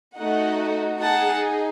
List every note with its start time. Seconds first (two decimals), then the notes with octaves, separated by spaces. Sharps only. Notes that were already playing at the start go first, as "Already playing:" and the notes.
0.18 A3 D#4 F#4 D#5 F#5
1.01 D#4 G#4 F#5 A5